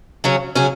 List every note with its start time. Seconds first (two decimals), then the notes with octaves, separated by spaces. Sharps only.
0.24 C#3 F#3 C#4 G#4
0.55 C#3 F#3 C#4 G#4